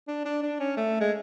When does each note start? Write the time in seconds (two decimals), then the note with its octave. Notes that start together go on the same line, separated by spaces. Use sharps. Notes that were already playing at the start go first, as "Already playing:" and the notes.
0.08 D4
0.25 D4
0.43 D4
0.60 C#4
0.77 A3
1.00 G#3